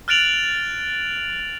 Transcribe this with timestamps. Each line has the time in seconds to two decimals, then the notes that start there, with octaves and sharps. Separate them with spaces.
0.08 F6 F#6 A6 D7 F7 F#7